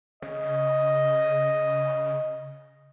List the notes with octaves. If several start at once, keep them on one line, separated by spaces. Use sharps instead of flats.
C#3 D#5